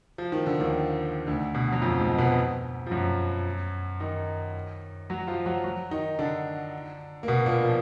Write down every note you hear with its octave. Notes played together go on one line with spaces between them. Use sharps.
F3
D#3
D3
D#2 D#3
D2 D3
B2
F#3
F2 F3
G#2 G#3
B2 B3
F3
F#2 F#3
D#3 D#4
F#3 F#4
F3 F4
F#3 F#4
F#3 F#4
D#3 D#4
D3 D4
A#3
B2 B3
A#2 A#3
F3